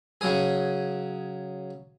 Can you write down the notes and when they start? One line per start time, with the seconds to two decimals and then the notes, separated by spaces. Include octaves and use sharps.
0.21 C#3 F#3 G#4